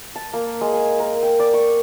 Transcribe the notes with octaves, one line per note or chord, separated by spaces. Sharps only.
A5
A#3
G#3
G#5
A#4
G5
D5
C#6